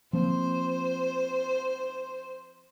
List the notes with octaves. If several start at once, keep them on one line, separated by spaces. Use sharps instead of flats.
F3 A#3 C4 C5